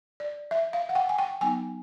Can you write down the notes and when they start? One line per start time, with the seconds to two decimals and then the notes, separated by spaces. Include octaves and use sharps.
0.20 D5
0.51 E5
0.73 F5
0.89 F#5
0.95 G5
1.09 G#5
1.18 G5
1.41 F#3 B3 D#4 G#5